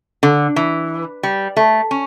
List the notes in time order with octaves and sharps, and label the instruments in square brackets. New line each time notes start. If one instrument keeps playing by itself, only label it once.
[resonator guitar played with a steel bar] D3
E3
G3
A3
C#4